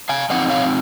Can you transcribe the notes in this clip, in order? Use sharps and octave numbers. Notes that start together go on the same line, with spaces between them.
F5 G#5
F3 C4 D#4 D#5 F#5
C#5 F5